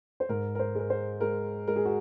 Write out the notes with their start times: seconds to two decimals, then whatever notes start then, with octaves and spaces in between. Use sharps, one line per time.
0.20 C5
0.29 G#2 A#4
0.55 A#4
0.59 C5
0.75 G#3 A#4
0.90 C5
1.21 G#3 A#4
1.67 G#3 A#4
1.76 G#4
1.85 F#4